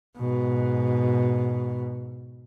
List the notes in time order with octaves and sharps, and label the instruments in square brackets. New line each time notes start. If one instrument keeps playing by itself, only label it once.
[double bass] G#2 B2